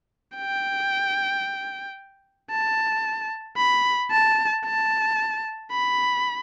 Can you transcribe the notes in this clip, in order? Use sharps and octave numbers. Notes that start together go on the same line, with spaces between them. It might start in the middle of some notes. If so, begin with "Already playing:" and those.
G5
A5
B5
A5
A5
B5